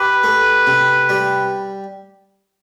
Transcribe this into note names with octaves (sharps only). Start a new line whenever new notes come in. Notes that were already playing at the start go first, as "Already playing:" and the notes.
Already playing: G4 B4
A3
C3
G3